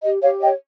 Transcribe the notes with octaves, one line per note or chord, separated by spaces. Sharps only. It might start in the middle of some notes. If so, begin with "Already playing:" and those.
G4 D#5
G4 C#5 F5
C#5 D#5 G5